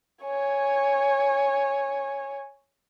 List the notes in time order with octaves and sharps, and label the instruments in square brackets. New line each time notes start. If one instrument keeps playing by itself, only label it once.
[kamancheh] C#5 G#5